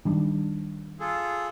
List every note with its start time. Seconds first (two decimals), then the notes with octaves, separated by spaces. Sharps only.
0.05 D#3 G3 D4
1.00 F4 G#4 A4